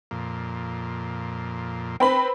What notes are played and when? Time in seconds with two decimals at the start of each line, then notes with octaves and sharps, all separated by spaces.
0.11 F2 A#2
2.00 C4 B4 B5